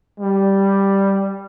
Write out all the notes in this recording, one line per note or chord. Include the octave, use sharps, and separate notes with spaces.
G3